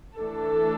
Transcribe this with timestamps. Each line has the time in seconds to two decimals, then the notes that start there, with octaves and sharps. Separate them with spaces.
0.18 E3 A3 D4 A4